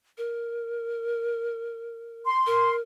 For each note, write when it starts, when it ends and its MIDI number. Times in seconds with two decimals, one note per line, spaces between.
0.18 2.28 70
2.25 2.73 84
2.47 2.80 70